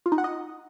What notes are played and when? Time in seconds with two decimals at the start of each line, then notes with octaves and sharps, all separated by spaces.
0.06 F4
0.12 D#4
0.18 F#5
0.24 D#5